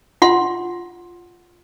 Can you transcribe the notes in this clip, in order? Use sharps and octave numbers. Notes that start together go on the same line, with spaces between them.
F4 F#5 C6